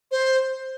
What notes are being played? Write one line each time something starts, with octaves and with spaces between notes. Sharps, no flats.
C5